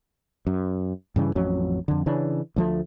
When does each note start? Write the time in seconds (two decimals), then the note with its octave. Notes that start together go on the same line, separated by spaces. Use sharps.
0.47 F#2
1.16 G2 C#3 E3
1.35 A1 F2 F#3 C#4
1.88 F2 D3
2.06 C#3 E3 C#4 D4
2.56 D2 F3 A3